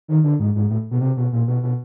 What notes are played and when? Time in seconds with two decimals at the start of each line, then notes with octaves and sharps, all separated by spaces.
0.08 D#3
0.24 D3
0.40 G#2
0.55 G#2
0.70 A2
0.91 B2
1.01 C3
1.17 B2
1.32 A#2
1.48 B2
1.63 B2